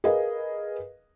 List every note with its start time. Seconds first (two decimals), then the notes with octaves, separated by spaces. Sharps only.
0.04 G#4 A#4 B4 D#5 F5